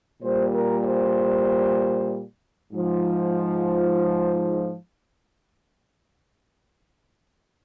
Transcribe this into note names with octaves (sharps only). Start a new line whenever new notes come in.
A#2 G3 C5
A#4
C5
G#2 F3